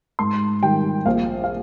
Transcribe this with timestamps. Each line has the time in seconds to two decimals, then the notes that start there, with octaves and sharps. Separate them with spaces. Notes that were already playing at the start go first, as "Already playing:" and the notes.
0.19 G#2 C6
0.63 D#3 G3 G5
1.06 A#1 F5
1.44 F5